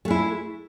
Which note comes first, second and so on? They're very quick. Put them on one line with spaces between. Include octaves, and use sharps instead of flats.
A3 G#3 E4